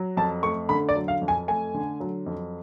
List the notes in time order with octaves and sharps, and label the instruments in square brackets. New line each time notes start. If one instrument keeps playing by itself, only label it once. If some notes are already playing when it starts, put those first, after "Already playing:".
Already playing: [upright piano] F#3
F2 A5
A3 C#6
D3 B5
D5
F#3
F5
F2
G#5
A3 G#5
D3
F#3
F2